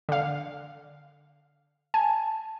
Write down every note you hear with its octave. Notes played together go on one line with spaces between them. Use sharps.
D3 F5
G#5 A5